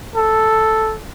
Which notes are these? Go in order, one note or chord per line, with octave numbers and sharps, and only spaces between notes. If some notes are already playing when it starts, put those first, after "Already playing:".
A4